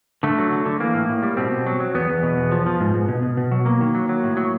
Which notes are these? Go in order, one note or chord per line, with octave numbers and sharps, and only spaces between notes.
D3 A3
F#3
D3
D3
E3 A#3
A2
A2
G3
B2 C4
B2
F#3
F#3
E2 B3
E2
B2
E2
F3
F3
G#2
G#2
B2
B2
B2
F#3
F#3 A#3
D#3
F#3
F#3
A2
F#3